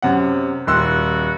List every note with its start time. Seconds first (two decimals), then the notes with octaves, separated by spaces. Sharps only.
0.02 F#2 C3 F#5
0.67 D#1 F#4 C6 E6